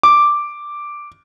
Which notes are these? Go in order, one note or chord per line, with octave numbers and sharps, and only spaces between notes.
D6